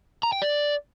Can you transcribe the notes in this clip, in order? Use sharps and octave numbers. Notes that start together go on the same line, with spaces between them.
A#5
G5
D5